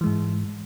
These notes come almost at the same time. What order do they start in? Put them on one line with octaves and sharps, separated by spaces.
E3 G#3 G#2